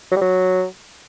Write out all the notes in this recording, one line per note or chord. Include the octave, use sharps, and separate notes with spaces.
F#3
G3
F#3